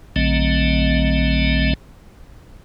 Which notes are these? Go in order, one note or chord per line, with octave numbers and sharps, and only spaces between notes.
A#1 D3 F#3 A3 C4 D#5